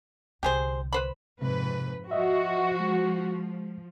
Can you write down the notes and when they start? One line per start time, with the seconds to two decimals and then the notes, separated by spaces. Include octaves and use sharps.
0.43 C2 D3 G4 G#4 C5
0.93 B4 C5 B5
1.42 F2 G#2 C3 B4
2.11 F3 F#4 D#5 E5
2.80 G#3